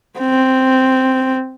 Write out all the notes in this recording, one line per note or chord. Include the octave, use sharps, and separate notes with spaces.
C4